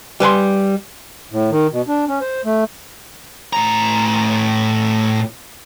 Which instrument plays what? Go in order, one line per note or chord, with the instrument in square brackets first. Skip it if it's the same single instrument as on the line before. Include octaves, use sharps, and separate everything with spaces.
[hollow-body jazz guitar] G3 B4 G#5 C6
[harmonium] A2
D#3
B2
D4
C#4
C5
A3
[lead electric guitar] A2 A#5